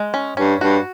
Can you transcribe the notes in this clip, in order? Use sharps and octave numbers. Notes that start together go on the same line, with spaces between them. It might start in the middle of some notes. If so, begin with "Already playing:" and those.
Already playing: G#3
C#4
G2 C#4
G2 F#4